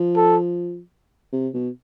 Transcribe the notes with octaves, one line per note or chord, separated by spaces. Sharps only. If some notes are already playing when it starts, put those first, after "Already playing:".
Already playing: F3
A4
C3
B2